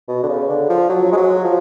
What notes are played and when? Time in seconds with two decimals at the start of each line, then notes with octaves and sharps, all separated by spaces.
0.08 B2
0.23 D3
0.28 C#3
0.49 D3
0.69 F3
0.89 F#3
1.12 G#3
1.17 F#3
1.44 F3